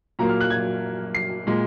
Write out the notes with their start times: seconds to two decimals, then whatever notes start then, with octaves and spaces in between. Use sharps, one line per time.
0.19 A#2 F#3 A#3 A#5
0.29 F6
0.41 F#6
0.50 G#6
1.15 C7
1.47 A#2 G#3